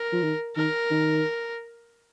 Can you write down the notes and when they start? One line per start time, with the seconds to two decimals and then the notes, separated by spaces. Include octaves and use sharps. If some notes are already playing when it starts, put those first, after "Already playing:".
Already playing: A#4
0.12 F3
0.22 D#3
0.56 D#3 A#4
0.91 D#3